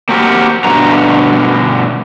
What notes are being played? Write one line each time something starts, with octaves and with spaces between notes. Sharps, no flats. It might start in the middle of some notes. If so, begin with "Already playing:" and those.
A#3 C4 F#4 G4 A#4
G2 B2 D3 F#4 A#5